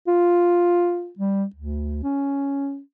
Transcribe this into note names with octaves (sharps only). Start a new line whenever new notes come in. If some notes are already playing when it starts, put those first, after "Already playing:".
F4
G3
D2
C#4